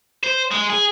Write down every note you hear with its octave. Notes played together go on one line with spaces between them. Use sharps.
C5
G#3
G#4